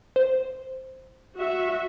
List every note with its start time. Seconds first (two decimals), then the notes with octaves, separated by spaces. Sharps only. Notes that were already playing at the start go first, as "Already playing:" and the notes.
0.16 C5
1.37 F#4 E5